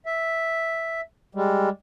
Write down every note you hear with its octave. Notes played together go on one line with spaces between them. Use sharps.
E5
G3 G#3